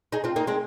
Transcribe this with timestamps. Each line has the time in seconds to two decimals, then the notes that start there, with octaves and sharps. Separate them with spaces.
0.12 D#4 G#4
0.24 C4 F4
0.36 A#3 D#4
0.47 G#3 C4